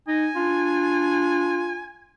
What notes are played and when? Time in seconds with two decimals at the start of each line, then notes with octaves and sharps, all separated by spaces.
0.08 D#4 G#5
0.36 D4 F4